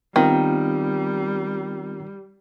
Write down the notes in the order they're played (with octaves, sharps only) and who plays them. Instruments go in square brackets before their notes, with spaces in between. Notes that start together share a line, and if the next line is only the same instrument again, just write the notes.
[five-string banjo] D#3 [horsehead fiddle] G3 [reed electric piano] B3 C4 F4